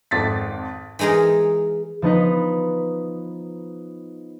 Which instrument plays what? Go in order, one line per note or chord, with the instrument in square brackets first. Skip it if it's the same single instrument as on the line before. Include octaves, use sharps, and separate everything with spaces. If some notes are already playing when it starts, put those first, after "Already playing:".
[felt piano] G#1 F2 A6 B6
[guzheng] E3 G#3 D#4 G#4 A#4
[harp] F3 B3 D#4 B4